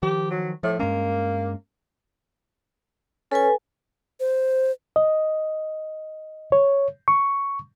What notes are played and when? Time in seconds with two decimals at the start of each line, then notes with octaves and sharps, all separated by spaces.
0.03 D#3 F3 G4
0.30 F#3
0.63 A2 F3
0.79 G2 G#3 A#3 C#4
3.32 C#4 A4 B4 G#5
4.20 C5
4.96 D#5
6.52 C#5
7.08 C#6